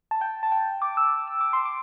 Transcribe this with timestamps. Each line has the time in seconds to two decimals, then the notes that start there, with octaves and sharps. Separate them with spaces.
0.11 A5
0.21 G5
0.43 A5
0.52 G5
0.82 D6
0.97 E6
1.28 E6
1.41 D6
1.53 C6
1.65 D6